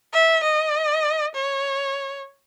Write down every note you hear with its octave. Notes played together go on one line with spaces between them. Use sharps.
E5
D#5
C#5